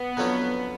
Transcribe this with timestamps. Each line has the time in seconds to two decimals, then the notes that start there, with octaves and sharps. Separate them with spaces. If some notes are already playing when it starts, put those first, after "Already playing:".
Already playing: B3
0.17 F2 D3 F#3 A3 C#4